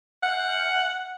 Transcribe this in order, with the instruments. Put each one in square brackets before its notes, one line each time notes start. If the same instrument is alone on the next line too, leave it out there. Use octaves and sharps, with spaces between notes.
[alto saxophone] F#5